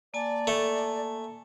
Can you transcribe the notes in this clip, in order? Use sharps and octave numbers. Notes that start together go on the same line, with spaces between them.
A#3 D5 G#5 A5
A3